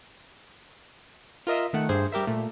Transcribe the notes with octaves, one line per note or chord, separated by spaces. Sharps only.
F4 A#4 D#5 E5
D#3 A3 F#5
G2 G#4 C5
G3 G4 A#4 E5
A#2 A3